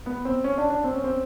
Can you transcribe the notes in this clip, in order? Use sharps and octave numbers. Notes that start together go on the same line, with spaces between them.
B3
C4
C#4
D4
D4
C4
C#4
C4